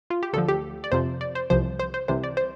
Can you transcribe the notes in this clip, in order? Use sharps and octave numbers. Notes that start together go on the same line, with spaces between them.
F4
G4
D2 D3 F3 A4
G4
D5
F2 C3 F3 C5
D5
C5
C2 C3 F3 C5
C5
C5
C2 C3 E3 C5
D5
C5